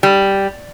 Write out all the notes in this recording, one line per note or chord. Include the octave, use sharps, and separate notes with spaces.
G3